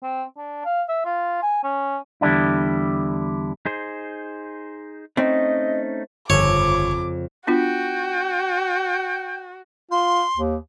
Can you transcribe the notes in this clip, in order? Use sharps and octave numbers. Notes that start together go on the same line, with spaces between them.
C4
D4
F5
E5
F4
G#5
C#4
E2 D3 G3 D4 E4
D#4 G#4 C5
A3 C4 C#4 D#4 D#5
G1 F2 C#3 C#5 D6
B3 D4 F4 F#4 G5
F4 C6
D#2